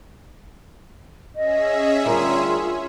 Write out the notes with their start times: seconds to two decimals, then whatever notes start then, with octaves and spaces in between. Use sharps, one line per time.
1.35 C#4 G#4 D#5 E5
2.05 D2 G3 F4 A#4